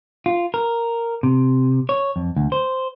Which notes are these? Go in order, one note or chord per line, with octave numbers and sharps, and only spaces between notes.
F4
A#4
C3
C#5
F2
D2
C5